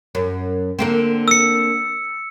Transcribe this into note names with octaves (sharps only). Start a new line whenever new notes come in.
F#2
D3 A#3 C4
E6 C#7